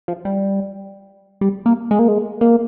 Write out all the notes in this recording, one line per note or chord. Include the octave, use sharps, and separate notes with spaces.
F3
G3
G3
A#3
G#3
A#3
G#3
A#3